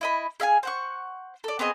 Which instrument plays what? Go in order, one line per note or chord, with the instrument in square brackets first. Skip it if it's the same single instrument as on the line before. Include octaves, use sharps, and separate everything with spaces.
[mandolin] E4 D#5 B5
G#4 E5 F5 G#5
C5 F#5 C#6
A4 D5
B3 C4 G#4 D#5